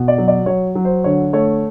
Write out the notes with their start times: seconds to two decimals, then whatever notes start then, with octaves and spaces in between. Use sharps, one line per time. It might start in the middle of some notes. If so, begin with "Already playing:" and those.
Already playing: B2
0.08 D5
0.18 F#3
0.28 D5
0.46 F#3 C#5
0.75 F#3
0.85 C5
1.04 D3 C#5
1.33 A3 C#5